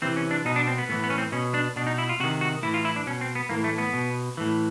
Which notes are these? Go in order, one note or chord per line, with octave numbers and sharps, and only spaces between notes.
C3 E3 C4
C#4
D4
B2 D#4
D4
C4
B3
A2 E3 B3
B3
C#4
C4
B2 C#4
D4
B2 D4
D#4
E4
F4
C3 D#3 F#4
F#4
A2 E3 E4
F4
E4
D4
B2 C#4
C4
B3
A2 E3 A#3
A3
B3
B2
A2 E3